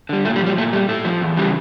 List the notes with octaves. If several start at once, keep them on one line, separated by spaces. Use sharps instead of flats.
D3 G3
A#2 A3
G3
F3
G3
A#2 A3
G3 A3
A2 A3
F3
E2
C#3 E3 G3